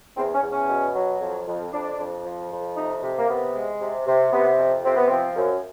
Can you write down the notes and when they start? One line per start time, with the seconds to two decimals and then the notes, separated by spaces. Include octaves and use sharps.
0.17 E2 C4
0.34 C#4
0.43 E2
0.52 C#4
0.69 B2
0.95 F#3
1.20 F2
1.47 F2
1.73 F2 D4
1.99 F2
2.25 F3
2.51 F2
2.76 C3 D#4
3.03 C3
3.18 A#3
3.29 C3 B3
3.54 G#3
3.80 C3
4.07 C3
4.32 C3 B3
4.58 F2
4.84 C3 C4
4.96 B3
5.08 F3 C4
5.36 F#2